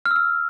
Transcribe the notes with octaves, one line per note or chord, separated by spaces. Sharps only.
F6
E6
F6